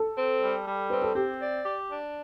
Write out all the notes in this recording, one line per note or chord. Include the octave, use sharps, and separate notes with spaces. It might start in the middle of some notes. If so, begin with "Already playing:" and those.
Already playing: A4
C4
G3
G3
C4 B4
A4
C4 G4
D5
G4
D4